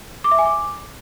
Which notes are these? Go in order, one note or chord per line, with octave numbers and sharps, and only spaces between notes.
D6
E5
G#5
D6